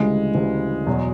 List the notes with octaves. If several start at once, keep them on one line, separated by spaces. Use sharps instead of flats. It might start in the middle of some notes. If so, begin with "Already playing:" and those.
Already playing: D2 C#3 E3 G3 G#3
D2 C#3 E3 G3
E2 B2 F#3